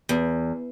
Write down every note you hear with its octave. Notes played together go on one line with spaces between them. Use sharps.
E2